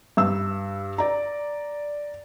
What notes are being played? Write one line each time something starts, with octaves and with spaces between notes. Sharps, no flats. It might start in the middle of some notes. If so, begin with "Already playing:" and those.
G2 E6
D5 A#5